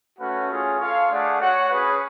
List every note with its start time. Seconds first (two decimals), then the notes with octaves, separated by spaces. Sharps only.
0.17 A3 C#4 F#4 B4 F#5
0.48 C#4 F4 G#4
0.79 F4 A4 C#5 F5
1.09 A3 D4 G#4 D5 F#5
1.39 F#4 C#5 F#5
1.70 C#4 G#4 B4